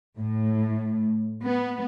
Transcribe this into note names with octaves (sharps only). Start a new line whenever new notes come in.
A2
B3